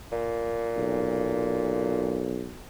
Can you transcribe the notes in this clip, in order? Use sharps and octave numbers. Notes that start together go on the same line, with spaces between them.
A#2
B1